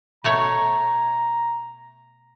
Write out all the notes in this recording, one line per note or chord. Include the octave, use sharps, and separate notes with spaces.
B2 A3 C#5 A#5